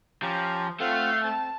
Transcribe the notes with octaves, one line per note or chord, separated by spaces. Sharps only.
F3 C#4 G4 A#5
A3 C4 F4 F5 F#5
C4 A5